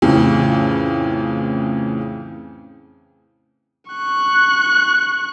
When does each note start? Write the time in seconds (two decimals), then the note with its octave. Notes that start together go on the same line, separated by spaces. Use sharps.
0.02 F2 A2 C#3 E3
3.91 C#6 F#6